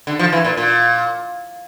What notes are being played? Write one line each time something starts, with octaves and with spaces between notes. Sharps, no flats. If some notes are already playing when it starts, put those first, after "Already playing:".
D3
F3
E3
A#2
A#2